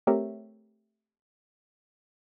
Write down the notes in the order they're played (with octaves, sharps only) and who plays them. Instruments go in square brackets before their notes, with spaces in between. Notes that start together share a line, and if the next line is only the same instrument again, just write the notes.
[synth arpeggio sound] A3 C4 G4 A#4 C#5 E5